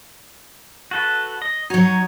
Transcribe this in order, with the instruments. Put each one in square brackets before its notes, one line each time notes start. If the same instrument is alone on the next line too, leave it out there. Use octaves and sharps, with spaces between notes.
[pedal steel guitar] F#4 A4 B4
D#5
[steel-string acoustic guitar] F#3 F#4 [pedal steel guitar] D#4 C#5